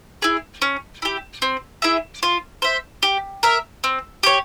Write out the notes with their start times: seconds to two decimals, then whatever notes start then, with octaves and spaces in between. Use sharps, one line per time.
0.22 E4 G#4
0.62 C#4
1.02 E4 G4
1.42 C4
1.82 E4 G#4 E5
2.23 F4
2.62 C5 E5
3.03 G4
3.43 A#4 E5
3.84 C4
4.23 G4 C#5